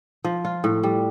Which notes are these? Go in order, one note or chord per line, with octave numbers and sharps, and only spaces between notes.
F3
F4
A2
G3